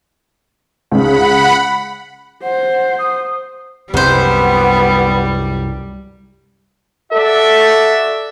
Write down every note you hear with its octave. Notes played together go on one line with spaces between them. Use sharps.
C#2 C#3 F#5 B5
C5 F#5
D#6
C2 F#2 C3 G3 B3 C5
F#4 A4 D5 E5